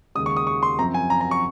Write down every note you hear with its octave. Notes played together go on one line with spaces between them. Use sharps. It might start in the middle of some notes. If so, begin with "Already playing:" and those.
D#2 C#3 G#3 D#6
C#6
D#6
C#6
C6
F#2 F3 C4 A#5
G#5
A#5
A#5
C#6